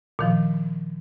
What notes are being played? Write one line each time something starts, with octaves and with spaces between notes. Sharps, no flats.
A#2 D#3 F3